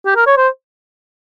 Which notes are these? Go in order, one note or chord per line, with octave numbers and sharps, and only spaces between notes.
G4
A#4
C#5
C5